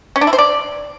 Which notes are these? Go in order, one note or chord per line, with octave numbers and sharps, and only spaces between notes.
C#4
D4
E4
C5
D5